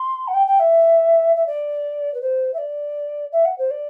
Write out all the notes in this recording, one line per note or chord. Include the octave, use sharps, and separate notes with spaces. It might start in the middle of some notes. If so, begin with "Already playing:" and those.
Already playing: C6
F#5
G5
G5
E5
E5
D5
B4
C5
E5
D5
E5
F#5
C5
D5